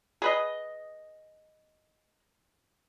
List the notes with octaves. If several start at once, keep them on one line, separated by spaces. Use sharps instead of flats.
G#4 B4 D#5